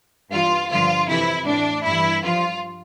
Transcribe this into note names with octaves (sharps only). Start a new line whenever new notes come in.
G2 E3 F4
G2 D3 F3 F4
F2 C3 E3 E4
A2 E3 D4
G2 E3 E4
G2 F3 F4